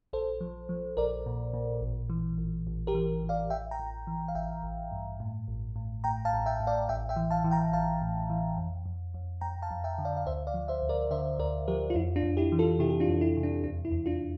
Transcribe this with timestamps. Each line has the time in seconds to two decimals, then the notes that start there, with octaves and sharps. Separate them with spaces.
0.13 A#1 A4 C5
0.41 F3
0.69 F3
0.97 A#1 A#4 D5
1.26 A#2
1.54 A#2
1.81 A1
2.09 E3
2.38 A1
2.67 A1
2.87 G4 A#4
2.94 E3
3.23 A1
3.29 D5 F5
3.50 A1 E5 G5
3.71 G5 A#5
3.80 A1
4.07 E3
4.28 F5
4.35 A1 E5 G5
4.63 A1
4.92 G2
5.20 A2
5.48 A1
5.76 A2
6.04 A2 G5 A#5
6.25 F5 A5
6.33 A1
6.46 E5 G5
6.60 A2
6.67 D5 F5
6.89 A1 E5 G5
7.09 E5 G5
7.16 E3
7.31 F5 A5
7.44 E3
7.51 G5 A#5
7.72 A1 F5 A5
8.02 A2
8.30 E3
8.57 F2
8.86 F2
9.14 F2
9.41 F2 G5 A#5
9.62 F5 A5
9.71 F2
9.84 E5 G5
9.98 D3
10.05 D5 F5
10.17 F5
10.26 D2 C5 E5
10.47 D5 F5
10.54 F3
10.68 C5 E5
10.82 D2
10.89 A#4 D5
11.11 D3 C5 E5
11.38 D2 A#4 D5
11.68 F3 G4 A#4
11.90 F4
11.95 F2 E4
12.16 D4 F4
12.23 F2
12.37 E4 G4
12.52 E3
12.59 F4 A4
12.79 C3 E4 G4
12.90 G4
13.00 D4 F4
13.08 F2
13.21 E4
13.37 C3
13.43 D4
13.64 E2 D4
13.85 E4
13.92 E2
14.06 D4 F4